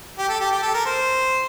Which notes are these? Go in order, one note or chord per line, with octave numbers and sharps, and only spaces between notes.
G4
A4
G4
G4
A4
A#4
C5